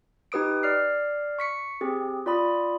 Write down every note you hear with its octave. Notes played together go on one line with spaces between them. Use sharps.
D#4 G4 B4 D#6 D7
D5 F6 C7
C#6 B6 C#7
C4 G4 G#4
F4 D5 B5 D#6